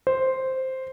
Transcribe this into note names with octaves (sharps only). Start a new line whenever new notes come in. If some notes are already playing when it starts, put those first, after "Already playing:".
C5